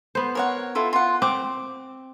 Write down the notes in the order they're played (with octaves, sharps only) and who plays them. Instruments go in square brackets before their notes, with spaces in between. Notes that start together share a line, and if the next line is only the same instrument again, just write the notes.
[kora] B3 C5
[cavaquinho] A#4 C#5 F#5
E4 F4 A4
F4 F#5
[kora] C4 [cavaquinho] D6